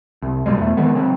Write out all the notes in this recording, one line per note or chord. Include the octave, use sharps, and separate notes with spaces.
C2
G1 B2 G3 G#3
E2 A3
D#3 E3 G#3 B3
C#3 F#3 C4